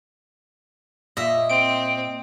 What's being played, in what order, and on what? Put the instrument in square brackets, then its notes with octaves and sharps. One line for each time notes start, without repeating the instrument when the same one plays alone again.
[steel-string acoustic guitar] A#2 [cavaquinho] D#5 E5
[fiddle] C4 [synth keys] D7